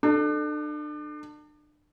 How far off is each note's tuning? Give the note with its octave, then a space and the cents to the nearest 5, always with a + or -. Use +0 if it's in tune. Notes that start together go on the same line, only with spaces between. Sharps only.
D4 +35 A4 +0